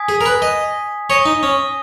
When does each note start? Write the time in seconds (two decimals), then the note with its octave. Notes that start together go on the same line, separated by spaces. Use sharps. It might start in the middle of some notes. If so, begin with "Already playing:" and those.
Already playing: G#5 D#6 G#6 B6
0.09 G#4
0.21 A#4
0.26 B4
0.42 D#5
1.10 C#5 D#6 A#6 D#7 G7
1.26 D#4
1.43 C#4